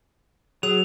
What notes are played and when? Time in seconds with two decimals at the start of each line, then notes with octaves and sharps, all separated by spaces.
0.63 F#3 G#4 F7